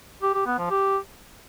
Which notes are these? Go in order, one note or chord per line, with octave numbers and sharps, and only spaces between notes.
G4
G4
B3
F3
G4